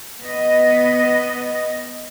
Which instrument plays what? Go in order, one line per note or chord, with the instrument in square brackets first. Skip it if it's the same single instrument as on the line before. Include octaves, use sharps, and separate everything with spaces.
[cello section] B3 D#5